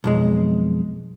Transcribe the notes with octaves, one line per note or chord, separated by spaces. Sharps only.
B1 F2 G#3